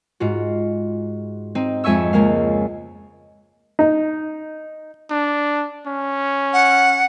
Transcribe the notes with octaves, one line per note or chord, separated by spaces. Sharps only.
G#2 F4 F#4
C4 D#4
F2 G#3 E5 G#5 C#6 E6
C#2 G#3 A#3 F5
D#4
D4
C#4
F#5